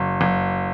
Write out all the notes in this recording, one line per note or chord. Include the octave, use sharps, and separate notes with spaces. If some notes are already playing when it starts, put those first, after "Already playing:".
Already playing: F#1
F#1